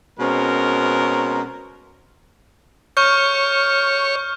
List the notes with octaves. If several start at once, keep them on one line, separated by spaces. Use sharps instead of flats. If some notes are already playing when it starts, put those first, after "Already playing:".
B2 G#3 C4 C#4 A#4
C#5 C#6 F6 G6